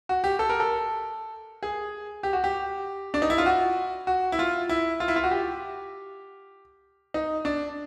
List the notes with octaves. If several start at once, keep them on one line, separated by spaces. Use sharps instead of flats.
F#4
G4
A4
A#4
A4
G#4
G4
F#4
G4
D4
D#4
E4
F4
F#4
F#4
E4
F4
E4
F4
E4
F4
F#4
G4
D#4
D4